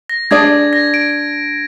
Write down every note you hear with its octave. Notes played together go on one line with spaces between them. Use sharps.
A#6
D4 G#4 D5 G#6
A#6
D7